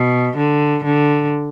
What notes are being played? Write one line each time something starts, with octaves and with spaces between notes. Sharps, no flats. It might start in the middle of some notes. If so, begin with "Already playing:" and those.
Already playing: B2
D3
D3